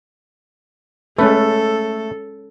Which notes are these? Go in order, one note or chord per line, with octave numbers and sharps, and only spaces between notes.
G#3 A3 C#4 A4 B4